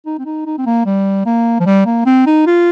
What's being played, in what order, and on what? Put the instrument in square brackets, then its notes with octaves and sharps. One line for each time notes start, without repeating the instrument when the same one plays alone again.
[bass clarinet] D#4
C4
D#4
D#4
C4
A#3
G3
A#3
F3
G3
A#3
C4
D#4
F4